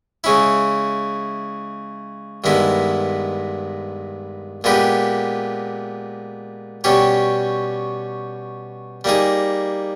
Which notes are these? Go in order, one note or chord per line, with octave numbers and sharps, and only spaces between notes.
C#3 G#3 C#4 E4
G2 D#3 G#3 B3 E4
A#2 G#3 B3 G4 B4
B2 G3 C#4 G4 C#5
G3 A#3 D#4 G#4